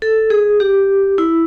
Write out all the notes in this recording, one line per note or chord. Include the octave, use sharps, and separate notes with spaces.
A4
G#4
G4
E4